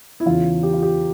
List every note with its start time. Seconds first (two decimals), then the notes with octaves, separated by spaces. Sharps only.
0.20 E4
0.26 E2 C#3 E3 F4
0.63 G4
0.73 F4
0.83 G4